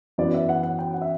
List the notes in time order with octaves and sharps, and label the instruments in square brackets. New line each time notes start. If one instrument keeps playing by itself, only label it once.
[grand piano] F#2 E3 B3 F#4 [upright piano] D5
[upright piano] E5
F#5
F#5
G5
F#5
E5